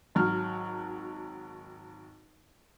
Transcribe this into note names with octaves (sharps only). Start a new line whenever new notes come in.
G#1 F#3 F6